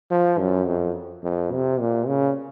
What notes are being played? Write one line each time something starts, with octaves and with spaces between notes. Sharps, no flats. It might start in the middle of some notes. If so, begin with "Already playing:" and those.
F3
F#2
F2
F2
C3
A#2
C#3